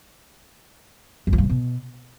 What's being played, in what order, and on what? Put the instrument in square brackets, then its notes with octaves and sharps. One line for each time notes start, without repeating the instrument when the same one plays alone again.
[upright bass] F#2
F3
G2
C3
B2